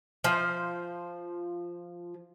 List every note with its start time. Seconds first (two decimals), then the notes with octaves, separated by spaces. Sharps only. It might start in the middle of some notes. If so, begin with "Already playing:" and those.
0.24 F3 C5